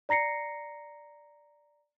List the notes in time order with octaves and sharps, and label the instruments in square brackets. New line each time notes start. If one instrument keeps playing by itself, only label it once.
[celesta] D5 A#5 A#6 C7 C#7